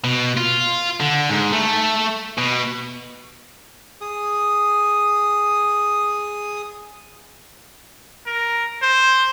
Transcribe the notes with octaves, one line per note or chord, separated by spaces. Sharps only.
B2
F4
D3
G#2
A3
B2
G#4 D#6
A#4
C5